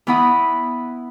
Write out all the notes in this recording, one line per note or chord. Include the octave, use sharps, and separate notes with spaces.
E3 B3 E4 F#5 B5 D#6